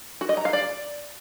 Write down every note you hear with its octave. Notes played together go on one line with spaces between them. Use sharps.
F#4
D#5
A#5
F5
D5